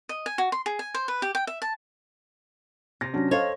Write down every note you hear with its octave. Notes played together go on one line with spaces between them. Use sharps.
D#5
G#5
F#4
C6
G#4
G#5
C5
B4
G4
G5
E5
A5
C3 A#6
F#3 C#4 D4
A4 C5 C#5 D#5 F5